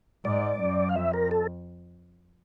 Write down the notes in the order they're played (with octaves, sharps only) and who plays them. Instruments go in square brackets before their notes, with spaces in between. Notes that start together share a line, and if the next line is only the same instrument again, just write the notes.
[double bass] G#2 [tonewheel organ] D5
[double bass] F#2
[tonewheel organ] F5
[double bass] F2 [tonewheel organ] E5
[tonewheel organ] A#4
A4